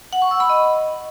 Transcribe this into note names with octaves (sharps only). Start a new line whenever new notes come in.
F#5
C#6
E6
B5
D#5